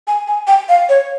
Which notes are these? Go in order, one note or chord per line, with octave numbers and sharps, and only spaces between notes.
G#5
G#5
G5
F5
C#5